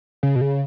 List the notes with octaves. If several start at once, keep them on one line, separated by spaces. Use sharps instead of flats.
C#3
B2
C#3